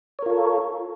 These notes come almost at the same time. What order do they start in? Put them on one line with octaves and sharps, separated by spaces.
C#5 A#4 F4 A4